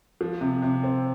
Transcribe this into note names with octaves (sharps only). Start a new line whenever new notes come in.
F3
C3
C3
C4